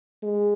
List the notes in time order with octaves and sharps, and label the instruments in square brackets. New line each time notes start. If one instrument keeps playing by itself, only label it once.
[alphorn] G#3